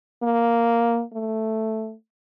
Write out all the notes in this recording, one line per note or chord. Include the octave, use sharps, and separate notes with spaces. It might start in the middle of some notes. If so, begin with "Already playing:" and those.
A#3
A3